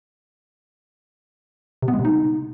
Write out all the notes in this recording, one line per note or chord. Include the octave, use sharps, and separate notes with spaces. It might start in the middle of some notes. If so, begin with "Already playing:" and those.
C3
B3
G#3
C3
D#4